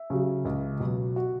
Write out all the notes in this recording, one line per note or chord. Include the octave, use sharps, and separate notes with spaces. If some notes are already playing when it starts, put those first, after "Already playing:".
Already playing: E5
C#3 F#3
C#2
B2 F#3
F#4